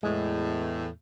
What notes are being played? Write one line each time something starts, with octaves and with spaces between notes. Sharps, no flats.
E2 A2 G#3